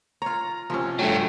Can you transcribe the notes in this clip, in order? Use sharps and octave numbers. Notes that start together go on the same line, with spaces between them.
F4 C#5 A#5
A1 C3 F3 C#4
G2 F#3 A3 G5